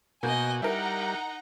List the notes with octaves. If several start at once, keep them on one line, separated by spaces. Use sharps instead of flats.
B2 A#3 F#4 D#5 G#5 G6
G3 D#4 E4 A#4 F#5 A#5